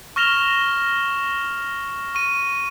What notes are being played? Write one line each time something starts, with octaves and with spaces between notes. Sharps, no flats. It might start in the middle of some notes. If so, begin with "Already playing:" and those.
C#6 F6 A#6 E7 F7 G7
C#6 D#7